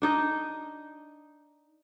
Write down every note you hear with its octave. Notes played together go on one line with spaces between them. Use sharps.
D4 D#4 D#5